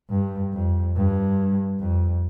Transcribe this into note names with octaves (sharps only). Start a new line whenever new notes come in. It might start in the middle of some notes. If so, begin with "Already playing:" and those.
G2
F2
G2
F2